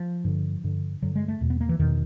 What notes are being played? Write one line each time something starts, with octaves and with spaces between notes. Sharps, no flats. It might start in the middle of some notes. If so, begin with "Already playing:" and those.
Already playing: F3
G2 D3
G2 D3
G2 D3 F#3
G#3
A3
E2 B2
B3
A#3
E3
E2 B2 D#3